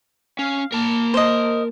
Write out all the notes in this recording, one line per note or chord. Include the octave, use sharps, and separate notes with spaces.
C#4 F5
A#3 A#4 A5
C5 D#5